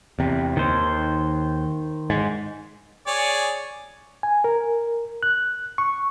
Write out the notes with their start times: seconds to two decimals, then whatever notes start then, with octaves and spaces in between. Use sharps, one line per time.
0.19 E2 C3
0.57 D#2 D#3 C5
2.10 G#2
3.07 G#4 C#5 D5
4.23 G#5
4.44 A#4
5.23 F#6
5.78 C#6